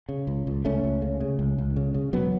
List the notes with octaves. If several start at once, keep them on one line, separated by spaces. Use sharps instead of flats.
C#3
C#2
C#2
C#2 A3 C#4
C#2
C#3
C#3
C#2
C#2
C#3
C#3
E1 F#3 B3